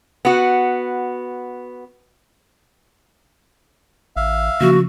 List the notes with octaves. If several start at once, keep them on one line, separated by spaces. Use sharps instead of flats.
B3 F#4
A1 E5 F5
C#3 F3 A#3 F#4